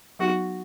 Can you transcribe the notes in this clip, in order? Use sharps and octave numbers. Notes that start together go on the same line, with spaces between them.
F#3 B3 D#4 F#4